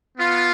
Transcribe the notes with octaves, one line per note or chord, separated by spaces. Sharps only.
B3 F4